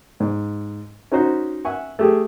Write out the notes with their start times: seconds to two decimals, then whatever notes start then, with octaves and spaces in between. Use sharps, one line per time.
0.20 G#2
1.12 C#4 D#4 F#4 C5 C#5
1.65 E5 F#5 G#5 C#6
1.99 A3 G4 G#4